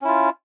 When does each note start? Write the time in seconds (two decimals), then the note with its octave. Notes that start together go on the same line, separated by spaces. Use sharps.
0.02 C#4
0.05 E4
0.08 F4